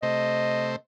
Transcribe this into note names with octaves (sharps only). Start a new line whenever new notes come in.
C3 A3 C5 D#5